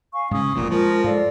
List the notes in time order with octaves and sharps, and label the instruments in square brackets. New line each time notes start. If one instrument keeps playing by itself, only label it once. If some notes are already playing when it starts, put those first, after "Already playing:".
[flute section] F5 G#5 C#6
[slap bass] G#2 C#3 [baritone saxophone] C#4 [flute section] C#6 D#6
[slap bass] E1 C#2 F3 [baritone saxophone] A#2
[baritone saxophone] F3 [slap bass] G#3 [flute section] A#4
[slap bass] G#2 [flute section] A4 D5 F5